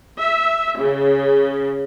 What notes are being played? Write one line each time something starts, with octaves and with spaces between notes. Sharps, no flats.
E5
C#3